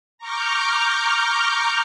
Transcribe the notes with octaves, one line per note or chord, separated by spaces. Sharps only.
A#5 C#6 D6 F6 G6